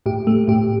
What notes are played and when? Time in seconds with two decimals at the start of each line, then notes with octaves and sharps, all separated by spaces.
0.06 A2 G4
0.27 A3
0.48 A2 G4